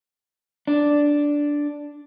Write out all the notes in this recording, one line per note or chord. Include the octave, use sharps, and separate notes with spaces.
D4